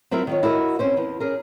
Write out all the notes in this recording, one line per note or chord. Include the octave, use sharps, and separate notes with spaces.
F#3 C4 E4 F4 A#4 E5
D#3 F4 C#5
E4 F#4 A#4 B4 D#5
C4 C#4 C5
E2 E3
C#4 G#4 A#4